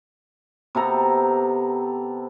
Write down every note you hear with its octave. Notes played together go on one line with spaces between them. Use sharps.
C3 B3 A4 A#5